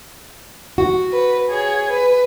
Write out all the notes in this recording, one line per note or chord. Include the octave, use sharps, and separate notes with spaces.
F#4
B4
G#4 C#5
B4